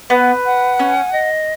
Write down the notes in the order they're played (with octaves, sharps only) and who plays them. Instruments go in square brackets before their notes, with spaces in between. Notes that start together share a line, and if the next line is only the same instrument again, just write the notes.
[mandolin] B3 [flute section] B4
[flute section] F#5
[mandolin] C#4 [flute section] G#5
[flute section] D#5